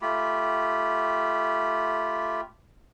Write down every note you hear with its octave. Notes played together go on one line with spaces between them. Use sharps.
A3 F4 G4 B5